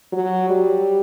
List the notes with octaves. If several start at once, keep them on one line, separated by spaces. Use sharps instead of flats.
F#3
G3